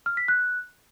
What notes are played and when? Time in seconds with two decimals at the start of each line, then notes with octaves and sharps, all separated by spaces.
0.06 F6
0.17 B6
0.28 F#6